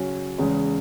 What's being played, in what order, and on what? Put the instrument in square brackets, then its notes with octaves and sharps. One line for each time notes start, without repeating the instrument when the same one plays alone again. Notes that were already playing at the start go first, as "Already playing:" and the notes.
Already playing: [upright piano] C#3 F#3 C#4
E2 C#3 G#3 C#4